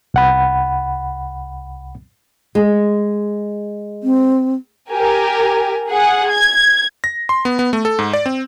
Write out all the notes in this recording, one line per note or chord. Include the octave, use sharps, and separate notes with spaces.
C2 F#5 B5
G#3
C4
G4 A#4 G#5
G#4 F#5
G#6
A#6
C6
B3
B3
A3
A4
G#2
D5
C4